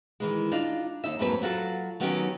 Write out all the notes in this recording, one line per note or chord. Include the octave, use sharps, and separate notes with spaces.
D#3 E3 G#3
D4 D#4 F4
D#2 D#4 E5
F2 G#2 F#3 A#3 C4 B4
F#3 F4 F#4 A4
D#3 F#3 B3 C#4 D#4 G4